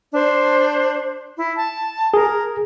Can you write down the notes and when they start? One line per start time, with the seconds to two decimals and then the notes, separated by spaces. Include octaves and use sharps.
0.13 D4 C5
1.36 E4
1.57 A5
2.14 G#4 A#4